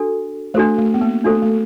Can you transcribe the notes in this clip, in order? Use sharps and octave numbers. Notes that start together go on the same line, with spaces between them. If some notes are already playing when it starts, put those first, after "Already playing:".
Already playing: D4 F#4 A4
A3 D4 F#4 A4 C5
A3
B3
A#3
A3 D4 F#4 A4 C5
A3